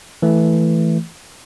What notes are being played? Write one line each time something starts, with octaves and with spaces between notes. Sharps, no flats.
E3 A3